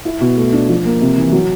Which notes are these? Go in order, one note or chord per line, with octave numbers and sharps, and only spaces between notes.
E4
B2
A3
D4
F3
A#3
C3
E3
F#3